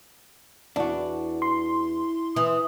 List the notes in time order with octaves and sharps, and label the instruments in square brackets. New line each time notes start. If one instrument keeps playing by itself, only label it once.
[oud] E2 [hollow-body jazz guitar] D4 F#4
[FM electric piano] C6
[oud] E3 [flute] D#6